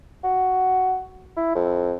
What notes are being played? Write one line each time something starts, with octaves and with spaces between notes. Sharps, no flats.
F#4
E4
F2